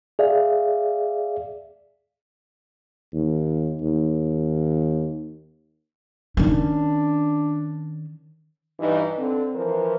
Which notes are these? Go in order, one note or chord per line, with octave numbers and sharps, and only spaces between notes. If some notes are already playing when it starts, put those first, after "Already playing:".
G#4 D5 E5 F5
D#2
D#2
D#3 C#4 D4
G2 E3 D#4
D3 C4
E3 F3 A#4 C5